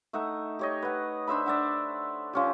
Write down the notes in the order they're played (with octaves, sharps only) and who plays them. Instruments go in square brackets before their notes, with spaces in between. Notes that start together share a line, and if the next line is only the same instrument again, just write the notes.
[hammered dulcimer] A3 D#4 E5 F#5
G4 C#5 D#5
B4 F#5
D4 C5 E5 B5
D5 E5 F#5
F3 C#4 G4